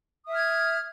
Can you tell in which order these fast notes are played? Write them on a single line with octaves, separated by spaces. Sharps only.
D#6 E5 F6 G#6